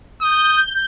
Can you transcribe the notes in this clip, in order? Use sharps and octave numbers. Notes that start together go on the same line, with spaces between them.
D#6 G6